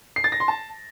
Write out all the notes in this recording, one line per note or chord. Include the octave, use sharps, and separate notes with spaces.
C7
A6
A#6
C6
A5